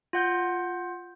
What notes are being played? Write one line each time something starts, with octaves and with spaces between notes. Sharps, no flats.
F4 F#5 G6